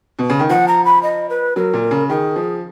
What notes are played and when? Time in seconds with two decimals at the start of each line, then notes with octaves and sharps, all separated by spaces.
0.19 B2
0.30 C#3
0.40 D#3
0.50 F3 F#5
0.68 A#5
0.85 B5
1.03 D#5
1.30 B4
1.56 F#3 A#4
1.73 A#2
1.91 C#3
2.09 D#3 G#4
2.36 F3